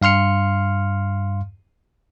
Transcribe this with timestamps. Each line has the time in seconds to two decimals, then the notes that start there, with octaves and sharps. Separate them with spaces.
0.02 G2 F5 C6 F6 C#7